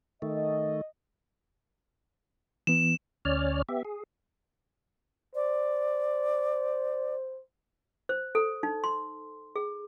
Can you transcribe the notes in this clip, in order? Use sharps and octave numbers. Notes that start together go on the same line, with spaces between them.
D#3 A3 D#5
E3 B3 E7
D2 C#4 C#5 D5 F6
B3 G4 E5
G#4
C5 D5
C5
A4
D#4
C6
G#4